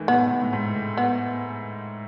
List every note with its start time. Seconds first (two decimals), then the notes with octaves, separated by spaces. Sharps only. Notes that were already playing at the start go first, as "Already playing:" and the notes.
Already playing: D#3 E3 G#3 A3
0.08 A2 B3
0.31 A2
0.42 A2
0.53 G#2
0.75 A2
0.97 B3